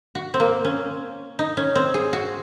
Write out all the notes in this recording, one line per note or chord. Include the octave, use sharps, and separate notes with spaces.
F#4
C4
A#3
C#4
D#4
C#4
C4
G#4
F#4